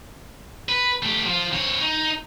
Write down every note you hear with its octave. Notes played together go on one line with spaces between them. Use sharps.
B4
A3 G4
F3 F4
C4 C#5
D#4